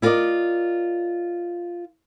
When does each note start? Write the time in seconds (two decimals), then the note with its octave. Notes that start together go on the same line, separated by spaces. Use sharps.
0.02 E4 F4 A#4 B4 D5 D#5